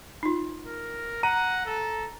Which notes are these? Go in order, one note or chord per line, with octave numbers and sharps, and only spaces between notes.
D#4 F4
A#4
F#5 A#5 D#7
A4